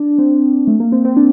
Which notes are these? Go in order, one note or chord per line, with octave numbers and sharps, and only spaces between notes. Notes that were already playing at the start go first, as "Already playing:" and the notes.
Already playing: D4
C4
A3
A#3
C4
C4
D4